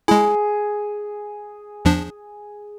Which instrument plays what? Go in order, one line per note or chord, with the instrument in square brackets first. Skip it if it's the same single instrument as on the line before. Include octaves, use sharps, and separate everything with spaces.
[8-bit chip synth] G#3 E4 [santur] G#4
[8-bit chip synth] E2 F3 D4